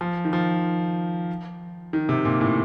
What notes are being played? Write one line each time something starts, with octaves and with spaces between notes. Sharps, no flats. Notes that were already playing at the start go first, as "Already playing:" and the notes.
F3
D#3
F3
D#3
C3
A#2
A2